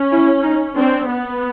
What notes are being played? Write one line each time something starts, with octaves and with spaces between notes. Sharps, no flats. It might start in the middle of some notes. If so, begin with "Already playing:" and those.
Already playing: C#4
E4
D#4
C4 D4
B3